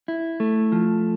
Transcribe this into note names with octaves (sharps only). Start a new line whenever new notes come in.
E4
A3
F3